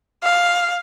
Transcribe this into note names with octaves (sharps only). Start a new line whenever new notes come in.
F5